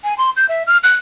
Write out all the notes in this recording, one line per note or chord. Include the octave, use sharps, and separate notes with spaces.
G#5
C6
G6
E5
F6
F#6